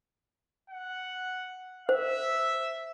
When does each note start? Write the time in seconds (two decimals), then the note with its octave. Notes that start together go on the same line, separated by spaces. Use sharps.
0.70 F#5
1.89 C5 E5